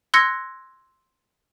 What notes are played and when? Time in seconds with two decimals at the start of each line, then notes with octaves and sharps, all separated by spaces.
0.14 C6 E6 F#6 G#6 A#6 C#7